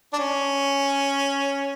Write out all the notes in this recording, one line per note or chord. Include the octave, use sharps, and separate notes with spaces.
D4
C#4